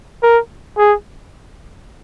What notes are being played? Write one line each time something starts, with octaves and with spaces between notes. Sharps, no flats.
A#4
G#4